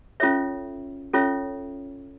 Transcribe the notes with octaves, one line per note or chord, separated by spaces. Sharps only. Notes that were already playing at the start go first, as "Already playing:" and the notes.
C#4 F4 A4 C#5 E5
C#4 F4 A4 C#5 E5